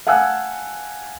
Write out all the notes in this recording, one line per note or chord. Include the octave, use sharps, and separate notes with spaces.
F5 F#5 G#5 A5 E6 F#6